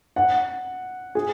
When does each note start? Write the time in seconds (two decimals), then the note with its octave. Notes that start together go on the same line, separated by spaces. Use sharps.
0.16 F#5
1.15 G#4